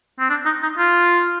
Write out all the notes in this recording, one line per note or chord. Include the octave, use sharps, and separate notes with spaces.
C4
D4
D#4
D#4
F4